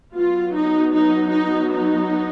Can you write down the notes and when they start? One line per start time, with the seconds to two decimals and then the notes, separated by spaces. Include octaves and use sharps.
0.14 F#3 B3 F4
0.54 D#4
0.93 D#4
1.31 D#4
1.71 D#4